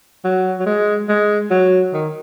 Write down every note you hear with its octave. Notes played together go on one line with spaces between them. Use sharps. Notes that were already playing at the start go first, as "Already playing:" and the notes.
F#3
F#3
G#3
G#3
F#3
D#3